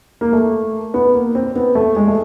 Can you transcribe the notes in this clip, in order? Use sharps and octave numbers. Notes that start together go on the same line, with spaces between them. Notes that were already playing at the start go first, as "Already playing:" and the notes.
A#3
A3
B3
A#3
C4
B3
A3
G#3
A3